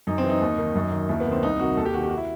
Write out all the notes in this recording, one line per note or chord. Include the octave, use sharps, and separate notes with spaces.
F#2 D#4
C4
E3
D#4
D#2
D#3
F#2
D#3
D#2 E4
B3
D#3
C4
C2 D#4
C3 D#3 F#4
D#2 A4
G4
D#3 F#4
G4
F#4
E4